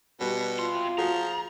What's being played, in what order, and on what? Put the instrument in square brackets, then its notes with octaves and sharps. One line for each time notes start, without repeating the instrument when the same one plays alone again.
[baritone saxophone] B2 [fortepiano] G3
[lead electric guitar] C3 C6 [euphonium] F4
[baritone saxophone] F3 [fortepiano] F#4 G#4 [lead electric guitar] A#5